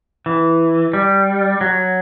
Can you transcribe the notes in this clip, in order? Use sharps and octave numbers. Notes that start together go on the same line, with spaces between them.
E3
G3
F#3